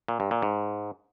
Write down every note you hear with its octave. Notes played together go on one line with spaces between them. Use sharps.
A#2
G2
A#2
G#2